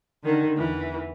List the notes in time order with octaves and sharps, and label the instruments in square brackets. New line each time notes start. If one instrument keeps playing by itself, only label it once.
[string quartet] D3 D#3
E2 E3